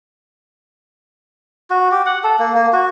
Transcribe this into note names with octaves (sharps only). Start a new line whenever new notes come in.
F#4
G4
F#5
A4
A#3
A#3
F#4